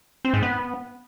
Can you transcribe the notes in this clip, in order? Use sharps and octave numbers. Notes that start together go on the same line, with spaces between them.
C4
G#2
B3